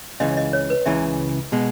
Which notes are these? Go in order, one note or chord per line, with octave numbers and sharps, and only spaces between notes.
C#2 C#3 E3 D#5
D#5
C#5
B4
C#2 C#3 E3 E5
B2 G#3